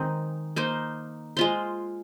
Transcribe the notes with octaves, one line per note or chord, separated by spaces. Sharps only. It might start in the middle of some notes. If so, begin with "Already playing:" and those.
Already playing: D#3 G#3 C4 D#4
A#3 D#4 C5
G#3 F4 C5